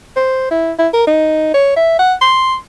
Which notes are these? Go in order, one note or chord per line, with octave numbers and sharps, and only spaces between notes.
C5
E4
E4
A#4
D#4
C#5
E5
F#5
C6